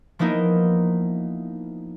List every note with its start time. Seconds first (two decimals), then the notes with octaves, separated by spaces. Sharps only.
0.19 F3 A#3 B3 D#4 E4 A#4